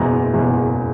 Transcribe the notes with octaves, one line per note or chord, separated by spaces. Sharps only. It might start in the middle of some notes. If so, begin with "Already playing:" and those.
Already playing: F#1 E2 B2 G#3 A#5
F#1 E2 B2 G#3